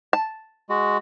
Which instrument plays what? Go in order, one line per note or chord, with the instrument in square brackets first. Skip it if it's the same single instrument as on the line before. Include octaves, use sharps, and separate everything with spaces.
[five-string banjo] A5
[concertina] G#3 F#4